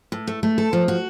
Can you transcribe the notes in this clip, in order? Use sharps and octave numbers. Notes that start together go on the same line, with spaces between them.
A2
A3
A3
A4
F3
F#4